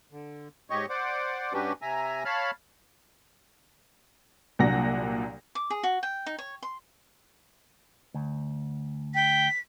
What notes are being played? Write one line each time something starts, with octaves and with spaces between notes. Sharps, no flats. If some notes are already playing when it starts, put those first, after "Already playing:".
D3
G#2 G4 C#5 D#5 C#6
C5 D5 F#5 D6
G2 C#4 D4 F#4 G4 B4
C3 E5 G#5 A#5
C#5 F5 A5 B5 F6
C2 A#2 F#3 D4 F#5 A#6
D6
G#4
F#4
G5
D#4
C#5
C6
D2
G5 B6